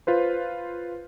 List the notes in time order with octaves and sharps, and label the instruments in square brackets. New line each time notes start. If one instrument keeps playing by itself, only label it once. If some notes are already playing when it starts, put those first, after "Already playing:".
[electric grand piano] F4 B4 C5